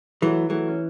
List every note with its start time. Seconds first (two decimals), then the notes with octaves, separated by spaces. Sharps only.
0.22 E3 F#3 A3
0.50 E3 F#3 A3
0.68 C#4